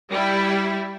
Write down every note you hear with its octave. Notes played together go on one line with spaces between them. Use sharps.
G3 E4